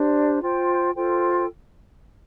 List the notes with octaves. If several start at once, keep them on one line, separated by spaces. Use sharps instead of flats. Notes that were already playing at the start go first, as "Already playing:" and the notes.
Already playing: D4 G4 C5
F4 C5 G5
F4 A4 C5 G5